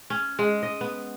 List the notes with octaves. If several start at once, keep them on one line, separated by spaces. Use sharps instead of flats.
C#4
G#3
D#5
B3